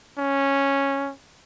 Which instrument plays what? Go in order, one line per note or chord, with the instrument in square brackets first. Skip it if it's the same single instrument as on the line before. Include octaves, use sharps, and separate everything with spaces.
[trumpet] C#4